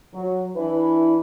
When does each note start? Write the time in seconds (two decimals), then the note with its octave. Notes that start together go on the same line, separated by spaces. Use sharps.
0.14 F#3
0.56 E3 D4 E4 B4